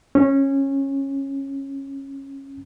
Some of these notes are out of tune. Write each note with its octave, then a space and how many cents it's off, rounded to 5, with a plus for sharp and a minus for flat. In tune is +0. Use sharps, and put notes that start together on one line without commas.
C#4 -15